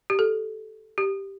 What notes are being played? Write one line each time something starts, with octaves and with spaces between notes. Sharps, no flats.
G4
A4
G4